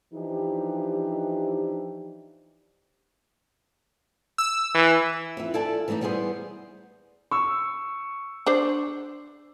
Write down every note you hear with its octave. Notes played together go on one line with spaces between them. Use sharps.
E3 F3 D4 D#4 G4
E6
E3
F2 E3 E5
E4 F4 A4 D5 G#5 A5
E3 G#3 A3 D4 D#4
G3 B3 E4 G#4 C5
C#6 E6
D4 C5